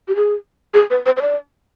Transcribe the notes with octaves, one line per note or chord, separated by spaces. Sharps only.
G4
G#4
G#4
B4
C5
C5
D5